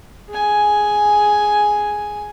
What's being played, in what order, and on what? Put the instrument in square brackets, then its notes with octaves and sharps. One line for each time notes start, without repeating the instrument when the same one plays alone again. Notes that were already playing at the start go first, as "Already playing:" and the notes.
[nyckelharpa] G#4 G#5